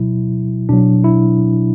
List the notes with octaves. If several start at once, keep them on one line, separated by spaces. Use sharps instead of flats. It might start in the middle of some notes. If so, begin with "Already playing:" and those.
Already playing: B2 F#3 E4
B2 F#3 D4
E4